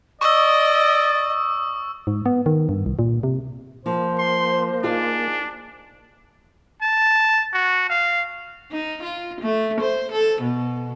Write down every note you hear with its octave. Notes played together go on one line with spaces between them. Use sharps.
D5 D#5 C#6 D#6 E6
G#2
B3
D#3
G2
C2
A#2
C3
F3 A#3 C5
C6
D4 D#4 F4 G#4
A5
F#4
F5
D#4
F4
A3
C5
A4
B2